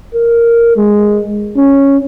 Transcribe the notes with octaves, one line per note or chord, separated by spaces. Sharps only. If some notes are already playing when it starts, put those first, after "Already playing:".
A#4
G#3
C#4